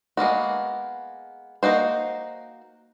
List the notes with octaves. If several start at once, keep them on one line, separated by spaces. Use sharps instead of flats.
G#3 A#3 B3 F#4
A#3 D#4 F#4 C5